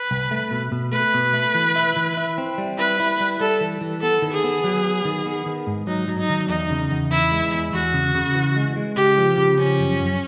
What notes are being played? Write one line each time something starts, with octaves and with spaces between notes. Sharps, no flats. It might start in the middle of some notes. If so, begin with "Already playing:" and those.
Already playing: B4
C2
A3
B2
B2
A3 B4
B2
A3
E3
E4
E3
E4
C4
G3
E4 B4
E4
G3
G3 A4
E3
E3
B3 A4
D#3
G#4
B3
F#3
B3
D#3
B3
D#3
G#2
F#3 D#4
F#3
D#4
D#3
E2 D#4
C#3
E2
E3 E4
G#3
E2
E2 F#4
C#3
C#3
E3
G#3
G#3
C#3 G4
F3
C#3
F3 C#4
F#2
F#2